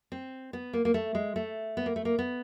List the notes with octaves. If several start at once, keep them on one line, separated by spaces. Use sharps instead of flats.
C4
B3
A#3
A#3
A3
G#3
A3
B3
A#3
A3
A#3
B3